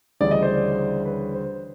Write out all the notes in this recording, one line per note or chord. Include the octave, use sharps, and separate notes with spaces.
D2 C#3 E3 G3 D5
D#5
C5 D5
B4 C#5
C5